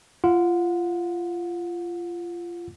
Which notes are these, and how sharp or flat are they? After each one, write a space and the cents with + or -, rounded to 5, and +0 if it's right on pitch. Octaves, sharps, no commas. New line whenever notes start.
F4 -20 F#5 -30